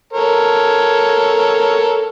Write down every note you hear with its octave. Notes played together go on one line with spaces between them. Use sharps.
A4 A#4 C#5